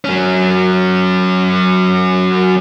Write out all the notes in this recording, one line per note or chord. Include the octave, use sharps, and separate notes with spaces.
F#3 C#4